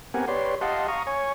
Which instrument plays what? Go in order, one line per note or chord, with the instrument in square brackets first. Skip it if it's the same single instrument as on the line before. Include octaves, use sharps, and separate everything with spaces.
[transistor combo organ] B3 C4 G4 A#4 F#5 G#5
G4 B4 C#5 D5 C6
G4 D#5 F5 F#5 A5 C6
F5 A#5 C#6 D#6
C#5 G#5 C#6